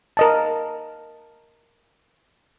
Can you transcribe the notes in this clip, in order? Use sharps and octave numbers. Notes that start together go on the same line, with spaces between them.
A#4 D#5 A5